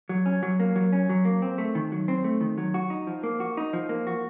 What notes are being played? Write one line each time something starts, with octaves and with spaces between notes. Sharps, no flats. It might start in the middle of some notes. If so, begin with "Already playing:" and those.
F#3
C#4
F#3
A#3
F#3
C#4
F#3
A#3
C4
A3
D#3
F#3
C4
A3
D#3
F#3
F#4
D#4
F3
A#3
F#4
D#4
F3
A#3
F#4